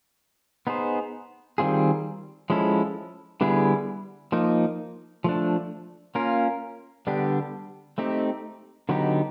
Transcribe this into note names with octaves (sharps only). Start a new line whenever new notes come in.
B3 D#4 G#4 C5
D#3 G3 C4 F4 G#4
F3 G#3 C#4 E4 A4
D3 G3 B3 E4 G#4
F3 A#3 D#4
F3 A3 D4
A#3 C#4 F4 A#4
D3 G3 B3 D4 G4
A3 C4 D#4 G4
D3 F#3 B3 D#4 G4